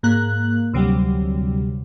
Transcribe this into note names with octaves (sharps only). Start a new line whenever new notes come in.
G#2 A#3 F#6
D2 C3 F#3 G3